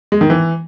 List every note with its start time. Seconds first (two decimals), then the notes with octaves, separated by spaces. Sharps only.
0.12 G#3
0.21 D#3
0.30 E3